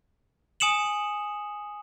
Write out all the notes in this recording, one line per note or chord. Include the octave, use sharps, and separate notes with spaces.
G#5 D#6 C#7 E7 F#7